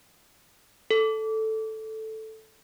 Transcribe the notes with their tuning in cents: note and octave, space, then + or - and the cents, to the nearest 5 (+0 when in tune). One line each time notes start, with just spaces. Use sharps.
A4 +0